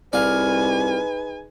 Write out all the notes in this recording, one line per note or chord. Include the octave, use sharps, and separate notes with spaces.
C2 D#4 G#4 B4 D5 F5 G#5